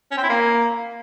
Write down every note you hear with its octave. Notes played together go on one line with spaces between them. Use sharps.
C#4
C4
E4
A#3